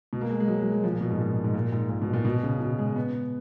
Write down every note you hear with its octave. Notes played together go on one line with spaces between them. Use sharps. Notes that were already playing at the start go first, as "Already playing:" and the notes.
B2
A#3
G#3
G#3
F#3
F#3
G#3
F3
A#2
B2
G#2
A#2
G#2
A#2
G#2
A#2
B2
A#2
B2
C#3
B2
G#3
B3